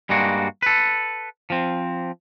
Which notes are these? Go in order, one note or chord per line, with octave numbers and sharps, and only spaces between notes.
G2 G3 G#3 A#3 F#4
A4 B4
F3 C4